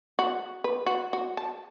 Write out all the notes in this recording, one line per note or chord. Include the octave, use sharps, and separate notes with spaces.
F#4
B4
F#4
F#4
A5